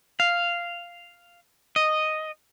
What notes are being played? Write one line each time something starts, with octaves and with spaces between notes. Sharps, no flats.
F5
D#5